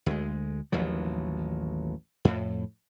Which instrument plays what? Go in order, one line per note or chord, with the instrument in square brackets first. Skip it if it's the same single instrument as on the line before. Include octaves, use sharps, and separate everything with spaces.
[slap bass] D2 G#3
A1 D#2 F3 F#3
F2 A2